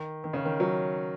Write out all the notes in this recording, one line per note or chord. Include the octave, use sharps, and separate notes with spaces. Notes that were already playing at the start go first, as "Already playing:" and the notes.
Already playing: D#3
D#3
C#3
D#3
F#3